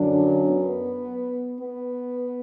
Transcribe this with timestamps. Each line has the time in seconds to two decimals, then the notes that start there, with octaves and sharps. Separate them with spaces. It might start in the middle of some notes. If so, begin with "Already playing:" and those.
Already playing: F#2 D3 F#3 D4
0.46 B3
1.58 B3